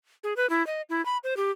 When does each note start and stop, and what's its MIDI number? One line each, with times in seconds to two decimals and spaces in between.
0.24 0.34 68
0.37 0.49 71
0.50 0.65 64
0.67 0.82 75
0.89 1.04 64
1.06 1.18 83
1.24 1.36 72
1.37 1.51 67